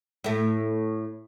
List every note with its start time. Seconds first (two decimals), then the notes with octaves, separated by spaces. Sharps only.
0.24 A2 A3